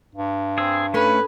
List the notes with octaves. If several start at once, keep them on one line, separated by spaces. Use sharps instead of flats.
G2
C4 G#4 E6
A3 C#4 D4 A4 B4 B5